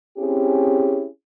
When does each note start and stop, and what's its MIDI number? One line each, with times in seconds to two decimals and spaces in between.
0.18 1.06 60
0.18 1.06 61
0.18 1.06 64
0.18 1.06 67
0.18 1.06 68